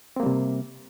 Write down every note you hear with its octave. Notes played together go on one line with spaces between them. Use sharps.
C3 G3 A#3 C4